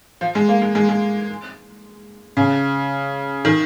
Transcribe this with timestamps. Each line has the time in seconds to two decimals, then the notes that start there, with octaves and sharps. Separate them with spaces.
0.21 F3
0.35 G#3
0.49 A#3
0.62 G#3
0.75 G#3
0.89 G#3
2.37 C#3
3.45 D#3